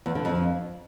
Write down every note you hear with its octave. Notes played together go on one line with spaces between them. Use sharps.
E2
D3
F2